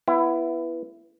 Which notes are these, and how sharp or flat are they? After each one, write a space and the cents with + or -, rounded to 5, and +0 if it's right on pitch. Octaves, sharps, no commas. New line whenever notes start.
B3 +0 E4 +20